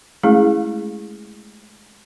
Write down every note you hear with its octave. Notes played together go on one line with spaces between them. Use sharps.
G#3 A3 C#4 E4 G#4